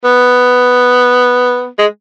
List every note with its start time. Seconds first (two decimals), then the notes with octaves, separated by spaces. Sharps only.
0.05 B3
1.78 G#3